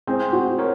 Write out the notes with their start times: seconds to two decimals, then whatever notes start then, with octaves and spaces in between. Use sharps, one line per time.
0.07 C4 G#4 C5
0.33 F#4
0.59 A#4 C#5